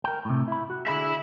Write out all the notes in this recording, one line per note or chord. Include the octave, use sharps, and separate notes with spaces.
A#4 G5
A2 C3
E4 B5
F#4
D3 G#4 E5 B5